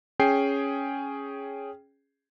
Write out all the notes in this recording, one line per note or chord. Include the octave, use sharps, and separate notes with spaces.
C#4 G#4 G5 C7